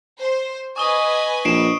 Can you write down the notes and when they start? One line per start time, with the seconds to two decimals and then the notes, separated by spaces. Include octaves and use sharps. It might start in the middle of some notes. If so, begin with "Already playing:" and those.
0.19 C5
0.76 B4 D#5 G#5 C#6 D#6 G7
1.45 A#1 C7 D7 E7